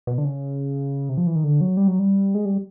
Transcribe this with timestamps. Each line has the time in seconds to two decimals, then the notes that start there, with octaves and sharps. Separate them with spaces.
0.07 B2
0.18 D3
0.25 C#3
1.09 C3
1.17 F3
1.27 E3
1.35 D#3
1.44 D3
1.61 F#3
1.77 G3
1.88 F#3
1.99 G3
2.35 G#3
2.45 G3